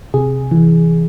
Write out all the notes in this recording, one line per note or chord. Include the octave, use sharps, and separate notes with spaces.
C3 G#4
E3